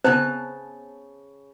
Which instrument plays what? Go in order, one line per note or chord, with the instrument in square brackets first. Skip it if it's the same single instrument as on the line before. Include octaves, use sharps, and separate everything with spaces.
[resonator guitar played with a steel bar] C#3 A5 [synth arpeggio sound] B3 C4 [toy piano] C5